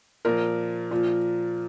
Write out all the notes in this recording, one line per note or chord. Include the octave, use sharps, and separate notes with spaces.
A#2 F3 A#4
A#2 F3